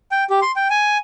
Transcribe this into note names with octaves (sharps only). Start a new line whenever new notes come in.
G5
G4
C6
G5
G#5